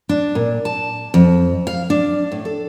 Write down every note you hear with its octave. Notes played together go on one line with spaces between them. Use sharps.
D4
A#2
A5
F2
F5
D4
A2
A4